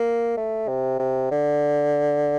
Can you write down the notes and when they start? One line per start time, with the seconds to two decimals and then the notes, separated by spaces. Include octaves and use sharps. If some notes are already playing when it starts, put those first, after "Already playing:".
Already playing: A#3
0.37 A3
0.68 C3
0.99 C3
1.31 D3